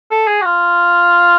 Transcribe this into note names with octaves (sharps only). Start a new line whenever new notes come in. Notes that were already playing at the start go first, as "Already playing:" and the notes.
A4
G#4
F#4
F4